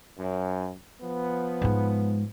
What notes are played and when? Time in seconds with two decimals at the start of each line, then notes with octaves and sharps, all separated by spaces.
0.18 F#2
1.00 F3 B3
1.62 G#2 G#3